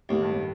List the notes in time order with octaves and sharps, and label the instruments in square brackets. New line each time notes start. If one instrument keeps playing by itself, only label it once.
[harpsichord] D#2 [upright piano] A2
[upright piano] G2
A2